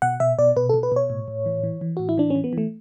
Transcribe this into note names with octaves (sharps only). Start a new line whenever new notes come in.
B2 F#5
B2 E5
B2 D5
B2 B4
A4
B2
B4
B2 C#5
A2
A2
E3
E3
E3
A2 F#4
E4
E3 D4
C#4
E3
B3
E3 A3